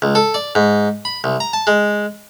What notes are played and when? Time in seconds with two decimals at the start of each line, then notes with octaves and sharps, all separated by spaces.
0.02 C#2
0.15 A4
0.34 D5
0.55 G#2
1.05 B5
1.24 C2
1.40 A#5
1.53 A5
1.67 G#3